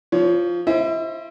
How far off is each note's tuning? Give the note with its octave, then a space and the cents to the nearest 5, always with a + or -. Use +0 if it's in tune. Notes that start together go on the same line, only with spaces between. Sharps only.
F3 +0 C#5 +25
E4 +40 C5 +30 E5 -40